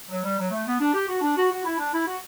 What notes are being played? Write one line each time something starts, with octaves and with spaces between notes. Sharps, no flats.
F#3
G3
F#3
A3
B3
D4
G4
F#4
D4
F#4
F#4
E4
D4
E4
F#4